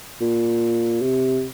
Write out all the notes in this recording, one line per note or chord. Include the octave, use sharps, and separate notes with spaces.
A#2
C3